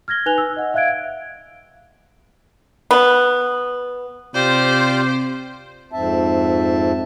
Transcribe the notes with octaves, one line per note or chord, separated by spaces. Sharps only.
F6 G#6 A#6 G7
D#4 B4 G#5 F#6 F7 G7
E6
D#5 F#5
E5 F5 F#6 G#6 D7
B3
C3 F4 G4 C5 D5
F2 G#2 C4 E5 A5